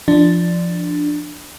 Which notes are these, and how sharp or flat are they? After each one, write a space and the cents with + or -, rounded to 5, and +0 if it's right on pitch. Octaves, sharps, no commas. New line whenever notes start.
F3 -15 D4 +5